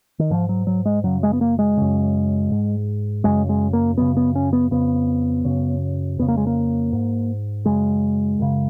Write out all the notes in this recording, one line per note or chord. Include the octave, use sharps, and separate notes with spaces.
D#3
G#2 F3
F#3
F#3
G#3
F#2 C#3 F#3
G#3
B3
A#3
G#3
F#2 C#3
G#2
F#2 C#3 G#3
G#3
A#3
F#2 C#3 B3
B3
C#4
B3
F2 C#3 B3
F#2 C#3
F2 C#3 B3
A#3
G#3
A#3
G#2
F#2 C#3 G#3
F#2 C#3